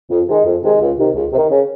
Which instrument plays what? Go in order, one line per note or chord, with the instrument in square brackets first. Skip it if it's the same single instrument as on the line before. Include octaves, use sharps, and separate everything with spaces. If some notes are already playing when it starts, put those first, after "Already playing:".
[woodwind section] F2
C3 D#3 G#3 D#4
F2
C3 D#3 G#3 D#4
C#2
C3 D#3
C#2
C3
D#3
C#3